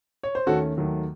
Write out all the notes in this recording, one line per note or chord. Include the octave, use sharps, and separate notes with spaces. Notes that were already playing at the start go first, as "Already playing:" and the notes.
C#5
C5
D#2 D#3 A3 C#4 F#4 A4
D#2 D#3 F#3 A3